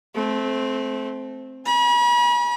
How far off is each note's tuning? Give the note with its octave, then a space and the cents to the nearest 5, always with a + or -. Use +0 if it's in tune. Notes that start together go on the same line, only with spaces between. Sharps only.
A3 -25 C4 +0
G#5 +0 B5 -45